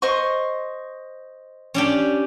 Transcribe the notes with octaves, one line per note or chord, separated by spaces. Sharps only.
C5 D#5 C#6
C#4 D4 G4